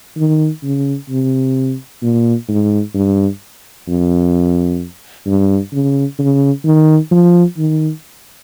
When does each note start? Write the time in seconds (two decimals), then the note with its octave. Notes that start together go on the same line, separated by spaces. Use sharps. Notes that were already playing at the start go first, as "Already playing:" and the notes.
0.17 D#3
0.63 C#3
1.10 C3
2.02 A#2
2.48 G#2
2.94 G2
3.88 F2
5.26 G2
5.73 C#3
6.19 C#3
6.65 D#3
7.11 F3
7.58 D#3